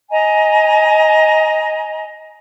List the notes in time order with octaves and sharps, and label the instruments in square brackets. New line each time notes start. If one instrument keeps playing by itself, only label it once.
[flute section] D#5 G#5 A#5